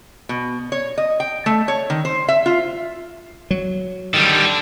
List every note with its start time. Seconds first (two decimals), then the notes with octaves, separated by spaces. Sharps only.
0.29 B2
0.72 C#5
0.98 D#5
1.20 G5
1.46 A3
1.68 C#5
1.90 D#3
2.05 C5
2.28 E5
2.46 F4
3.51 F#3
4.14 D#3 G3 D4 A4